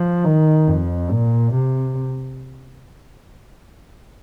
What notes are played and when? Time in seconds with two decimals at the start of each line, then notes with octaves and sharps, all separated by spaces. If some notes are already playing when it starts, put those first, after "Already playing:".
Already playing: F3
0.24 D#3
0.68 F2
1.11 A#2
1.54 C3